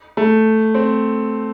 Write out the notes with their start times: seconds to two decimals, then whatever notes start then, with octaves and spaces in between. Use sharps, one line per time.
0.17 A3
0.75 C4